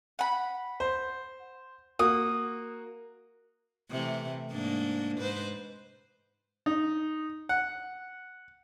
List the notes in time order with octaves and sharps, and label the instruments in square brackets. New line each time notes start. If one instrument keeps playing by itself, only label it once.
[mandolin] F#5 B5
[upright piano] C5
[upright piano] A#3 F#4 [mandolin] D#6
[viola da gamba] C3 E3 A3
G#2 A#3 D4
G#2 B4 C5
[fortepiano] D#4
F#5